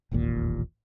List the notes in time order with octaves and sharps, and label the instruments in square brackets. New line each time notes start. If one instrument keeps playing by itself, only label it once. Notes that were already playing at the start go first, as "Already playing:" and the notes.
[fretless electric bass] E1 A1 D#2 A#2